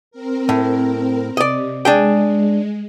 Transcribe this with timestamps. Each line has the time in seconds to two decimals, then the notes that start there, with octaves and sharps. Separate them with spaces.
0.11 C4 A#4
0.49 A2
1.37 C3 D5 D#5
1.85 G#3 D4 G#4 G5